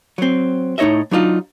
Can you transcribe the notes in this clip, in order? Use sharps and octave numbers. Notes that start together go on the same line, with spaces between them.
F#3 C4
A2 D#4 C#5 D#5 E5
F#3 D4 D#4 F4